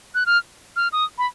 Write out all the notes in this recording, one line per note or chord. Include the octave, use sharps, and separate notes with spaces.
F#6
F6
F6
D#6
B5